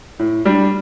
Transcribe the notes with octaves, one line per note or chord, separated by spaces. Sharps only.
A2
G3 D4